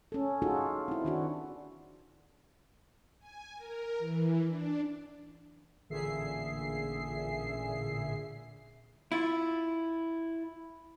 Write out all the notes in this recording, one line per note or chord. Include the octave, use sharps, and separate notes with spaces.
C#4 A4
D#4 F4 F#4 G#4 A4
C4 E4
D#3 D4 F#4
G#5
A#4
E3
D4
A1 A#2 D3 G#4 E5 C7
E4 F4